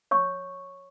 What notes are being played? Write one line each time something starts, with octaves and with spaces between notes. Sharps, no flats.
C#5 C#6